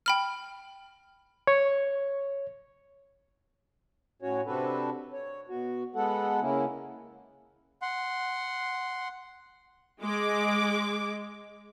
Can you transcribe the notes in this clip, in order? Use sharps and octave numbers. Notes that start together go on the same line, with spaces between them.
G5 B5 F6
C#5
A2 C#4 F#4 C#5
C3 C4 D4 F#4 A4 B4
C#5
B2 F#4
G#3 B3 A4 F#5
C#3 A#3 C#4 E4
F#5 C6
G#3 D6